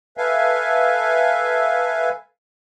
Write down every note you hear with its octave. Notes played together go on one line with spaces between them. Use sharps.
A4 B4 E5 F5 G#5